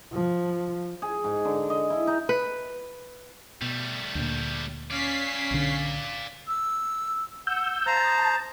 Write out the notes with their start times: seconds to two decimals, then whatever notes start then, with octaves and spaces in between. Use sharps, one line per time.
0.12 F3
1.02 G#4
1.24 G#2
1.45 D3
1.70 D#5
1.90 E4
2.07 D#4
2.29 B4
3.62 B2 G3 A3
4.15 D2 A#2
4.91 C#4 D5 F5 B6 C7
5.51 B1 D3
6.48 E6
7.47 F#5 E6 G6
7.86 C5 F5 A5 A#5
8.04 D#6